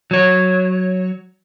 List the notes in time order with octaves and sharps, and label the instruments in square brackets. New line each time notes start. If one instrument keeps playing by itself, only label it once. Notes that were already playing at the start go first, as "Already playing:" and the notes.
[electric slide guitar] F#3 C#5